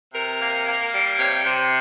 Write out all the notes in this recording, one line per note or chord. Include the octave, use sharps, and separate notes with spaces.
C3 A#4
A#3
A#3
G3
C3 C#5
C3